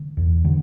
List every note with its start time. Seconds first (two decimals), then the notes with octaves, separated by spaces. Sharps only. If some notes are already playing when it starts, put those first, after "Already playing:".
Already playing: D3
0.17 E2
0.45 D3